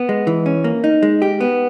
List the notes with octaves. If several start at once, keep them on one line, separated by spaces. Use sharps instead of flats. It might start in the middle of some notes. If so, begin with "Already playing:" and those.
Already playing: B3
G#3
E3
C#4
A#3
D#4
G#3
G4
B3